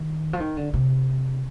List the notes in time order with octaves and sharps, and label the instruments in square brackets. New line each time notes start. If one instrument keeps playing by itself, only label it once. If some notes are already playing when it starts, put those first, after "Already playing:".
Already playing: [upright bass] D#3
F3
D#3
D3
C3